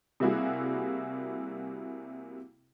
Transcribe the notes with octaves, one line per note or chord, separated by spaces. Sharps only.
C3 G3 A#3 E4 F#4 G#4